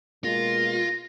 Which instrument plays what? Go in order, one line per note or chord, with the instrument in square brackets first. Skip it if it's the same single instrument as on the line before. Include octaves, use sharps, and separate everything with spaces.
[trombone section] B2 G#3 A#3 [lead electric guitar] F4 [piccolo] A#6